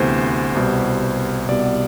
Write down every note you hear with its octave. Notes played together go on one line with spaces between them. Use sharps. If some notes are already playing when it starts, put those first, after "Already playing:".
Already playing: D2 C3 E3 B3 C5
C2 B2 G3
C2 B2 G3 B3 D5